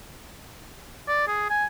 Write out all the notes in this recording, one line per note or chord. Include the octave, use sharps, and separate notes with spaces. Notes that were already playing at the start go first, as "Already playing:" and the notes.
D5
G#4
G#5